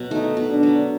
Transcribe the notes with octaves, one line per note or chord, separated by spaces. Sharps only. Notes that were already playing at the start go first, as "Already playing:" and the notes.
Already playing: B2 F#3
A3 D#4
B2
D4
F#3